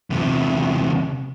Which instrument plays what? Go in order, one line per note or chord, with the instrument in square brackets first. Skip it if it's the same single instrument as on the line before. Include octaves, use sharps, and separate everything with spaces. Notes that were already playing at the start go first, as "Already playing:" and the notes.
[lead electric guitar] E2 C3